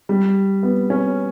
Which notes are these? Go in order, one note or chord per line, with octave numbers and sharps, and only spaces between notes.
G3
B3
C#4